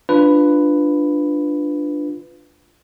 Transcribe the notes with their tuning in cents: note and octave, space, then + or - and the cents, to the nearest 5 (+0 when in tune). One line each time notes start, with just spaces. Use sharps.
D4 +5 F4 +0 B4 +5